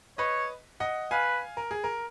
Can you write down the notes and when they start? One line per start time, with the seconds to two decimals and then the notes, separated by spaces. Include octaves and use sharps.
0.18 B4 C#5 D#5
0.80 D#5 F#5
1.11 B4 F5 G#5
1.57 A#4
1.71 G#4
1.84 A#4